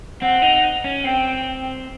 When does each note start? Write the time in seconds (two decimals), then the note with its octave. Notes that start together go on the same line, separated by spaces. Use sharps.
0.21 C4 F#5
0.42 D#4
0.84 C#4
1.05 C4 G5